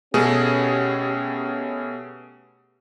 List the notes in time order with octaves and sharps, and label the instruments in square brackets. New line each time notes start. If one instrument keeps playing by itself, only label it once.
[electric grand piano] B2 A3 G#4 [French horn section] C#4 G4